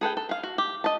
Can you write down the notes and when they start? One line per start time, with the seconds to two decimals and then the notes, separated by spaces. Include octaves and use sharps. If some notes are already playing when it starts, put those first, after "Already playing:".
0.01 G#4 A4 B4 G5
0.17 A4
0.29 G#4 F5
0.43 F#4
0.58 G4
0.84 D#5 A5